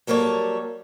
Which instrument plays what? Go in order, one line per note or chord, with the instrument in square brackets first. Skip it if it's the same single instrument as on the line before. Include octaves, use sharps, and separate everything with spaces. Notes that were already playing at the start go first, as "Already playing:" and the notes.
[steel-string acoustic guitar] F#3 G3 A#3 A4 C#5